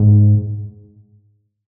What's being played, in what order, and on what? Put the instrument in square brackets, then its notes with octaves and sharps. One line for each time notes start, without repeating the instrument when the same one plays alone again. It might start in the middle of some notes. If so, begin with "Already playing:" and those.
Already playing: [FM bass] G#2